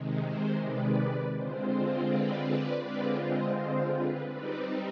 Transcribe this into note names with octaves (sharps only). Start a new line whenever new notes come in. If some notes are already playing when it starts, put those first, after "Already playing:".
Already playing: C3 D#3 G#3
C5
B4 D5
D3 G#3 C4 F4 C5
B4 D5
B4 D5
D3 G#3 C4 F4 B4 D5
C5 D#5
C5
B4
G3 C4 D#4 B4 D5